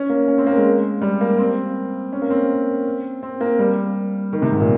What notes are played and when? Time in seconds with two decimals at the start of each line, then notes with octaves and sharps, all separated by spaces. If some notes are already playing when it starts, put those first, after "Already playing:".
Already playing: C#4
0.09 A#3
0.28 C#4
0.38 C4
0.47 A#3
0.57 G#3
1.02 G3
1.21 A#3
1.38 C4
2.13 C#4
2.22 A#3
2.30 C4
3.23 C4
3.41 A#3
3.59 G3
4.33 D#3
4.42 C3
4.51 G#2
4.60 A#2